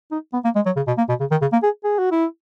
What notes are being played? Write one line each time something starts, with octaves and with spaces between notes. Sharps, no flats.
D#4
B3
A#3
G#3
F#3
C#3
B2
A#3
B2
C#3
D#3
C#3
A#3
G#4
G#4
F#4
E4